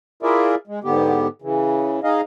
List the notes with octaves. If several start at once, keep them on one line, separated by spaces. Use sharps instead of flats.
E4 F4 G#4 A#4 D5 E5
G#3
G#2 D3 B3 G4
C#3 E3
D#4 G#4 D#5 F5